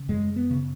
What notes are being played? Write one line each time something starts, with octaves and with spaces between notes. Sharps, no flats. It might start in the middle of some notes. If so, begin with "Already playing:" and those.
Already playing: C#3
F#2 G#3
B3
C#3